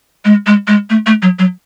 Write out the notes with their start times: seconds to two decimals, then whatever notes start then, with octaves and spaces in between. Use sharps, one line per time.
0.25 G#3
0.47 G#3
0.68 G#3
0.90 A3
1.06 A3
1.22 F#3
1.39 F#3